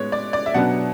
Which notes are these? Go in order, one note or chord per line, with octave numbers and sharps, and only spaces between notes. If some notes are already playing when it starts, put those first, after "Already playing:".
Already playing: A2 G#3 B3 C#5
D5
D5
E5
B2 F#3 B3 D4 F#5